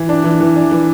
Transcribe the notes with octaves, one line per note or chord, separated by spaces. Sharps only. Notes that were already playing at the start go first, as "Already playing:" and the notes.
Already playing: E3
D4
E3
E3
D4
E3